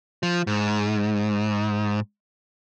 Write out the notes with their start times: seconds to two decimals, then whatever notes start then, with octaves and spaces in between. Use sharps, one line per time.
0.23 F3
0.47 G#2